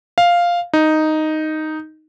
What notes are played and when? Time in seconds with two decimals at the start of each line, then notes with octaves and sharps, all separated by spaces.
0.18 F5
0.73 D#4